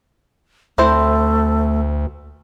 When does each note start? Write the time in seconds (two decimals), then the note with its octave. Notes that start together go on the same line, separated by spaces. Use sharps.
0.78 D2 A3 C4 E4 C5